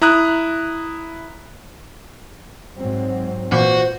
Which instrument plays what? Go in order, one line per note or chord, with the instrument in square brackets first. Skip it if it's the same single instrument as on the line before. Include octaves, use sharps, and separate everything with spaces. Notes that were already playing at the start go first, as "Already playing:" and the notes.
[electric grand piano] E4 A#5 D#6 F#6
[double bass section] G#2 F#3 C4
[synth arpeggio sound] A#2 E3 A#3 [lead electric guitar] F#4 [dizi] C5